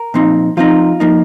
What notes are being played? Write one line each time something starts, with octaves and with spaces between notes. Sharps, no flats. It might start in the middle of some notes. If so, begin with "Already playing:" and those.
Already playing: A#4
A#2 F3 C4 D#4
F3 C4 D#4 F4
F3 A#3 D#4